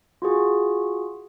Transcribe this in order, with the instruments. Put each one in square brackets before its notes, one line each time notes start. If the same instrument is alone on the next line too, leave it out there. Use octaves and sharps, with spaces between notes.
[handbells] F4 F#4 G#4